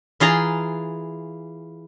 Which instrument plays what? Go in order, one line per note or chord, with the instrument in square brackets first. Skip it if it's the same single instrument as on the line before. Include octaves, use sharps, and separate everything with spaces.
[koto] E3 F4 G#4 A#5